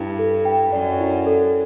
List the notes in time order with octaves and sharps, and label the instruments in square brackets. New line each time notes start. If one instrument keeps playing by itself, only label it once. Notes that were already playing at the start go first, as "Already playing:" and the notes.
Already playing: [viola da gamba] G2 [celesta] E4
[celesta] A4
G5
[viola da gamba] F#2 [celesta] D5
[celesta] E4
A4